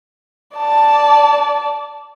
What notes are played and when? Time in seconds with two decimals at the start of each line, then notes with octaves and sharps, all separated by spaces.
0.56 D5 A5